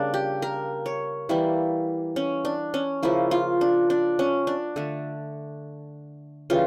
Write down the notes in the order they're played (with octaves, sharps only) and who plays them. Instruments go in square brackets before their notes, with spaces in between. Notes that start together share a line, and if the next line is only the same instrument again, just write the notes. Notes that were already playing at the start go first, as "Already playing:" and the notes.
Already playing: [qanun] C#3 G3 A#3 D4
G4
A#4
C#5
E3 G3 A#3 E4
C#4
D4
C#4
C#3 F3 A#3 E4
F4
D4
D4
C#4
D4
D3 A3
C#3 E3 G3 F4